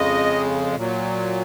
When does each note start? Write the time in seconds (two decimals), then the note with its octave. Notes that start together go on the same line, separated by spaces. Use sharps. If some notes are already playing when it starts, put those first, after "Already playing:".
Already playing: F2 C#3 G#3 D#5
0.76 A#2 F#3